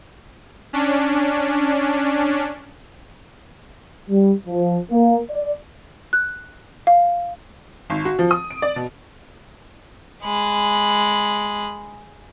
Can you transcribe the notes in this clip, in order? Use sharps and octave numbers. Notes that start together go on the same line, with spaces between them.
C#4 D4
G3
F3
A#3
D5
F#6
F5
G#1
F#4
F3
D#6
D7
D5
B2
G#3 B5